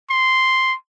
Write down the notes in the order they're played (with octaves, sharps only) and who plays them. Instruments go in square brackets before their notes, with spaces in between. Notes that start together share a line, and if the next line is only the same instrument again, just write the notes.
[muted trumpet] C6